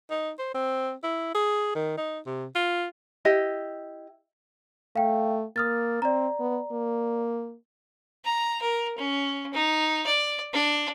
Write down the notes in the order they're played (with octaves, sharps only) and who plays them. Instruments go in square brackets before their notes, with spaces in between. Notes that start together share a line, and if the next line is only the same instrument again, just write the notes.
[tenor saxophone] D#4
C5
C4
E4
G#4
D#3
D#4
C3
F4
[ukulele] E4 G4 D#5
[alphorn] A3 [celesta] F5 G5
[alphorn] A#3 [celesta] D#6 F6 A6
[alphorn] C4 [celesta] D5 A#5
[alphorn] B3
A#3
[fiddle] A#5
A#4
C#4
D#4
D5
D4